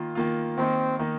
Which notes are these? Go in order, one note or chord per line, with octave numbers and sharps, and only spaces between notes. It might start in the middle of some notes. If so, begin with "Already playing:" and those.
Already playing: D#3 A#3 F4
D#3 A#3 F4
D#3 A#3 C4 D#4
D#3 A#3 D#4